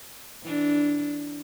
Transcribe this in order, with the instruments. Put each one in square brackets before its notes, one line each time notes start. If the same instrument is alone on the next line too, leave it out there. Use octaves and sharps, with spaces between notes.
[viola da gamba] E3 D4